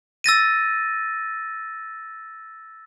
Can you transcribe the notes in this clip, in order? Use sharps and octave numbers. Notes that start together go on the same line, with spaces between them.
E6 A6 A#6 D#7